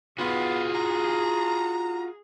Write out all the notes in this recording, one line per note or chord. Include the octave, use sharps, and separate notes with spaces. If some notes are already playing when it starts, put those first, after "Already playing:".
B3 F4 F#4 G#4
A#5